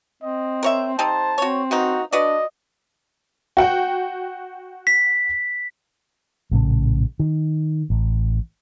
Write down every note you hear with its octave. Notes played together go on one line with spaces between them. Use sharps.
C4 D#5
A#4 C#5 E5
G3 C4 D#4 C5 A5
C4 F#4 C#5
B2 A#3 D#4 F#4
D4 F#4 B4 D5 D#5
F#4 F#5 G5
B6
A#1 A2 C#3
D#3
A1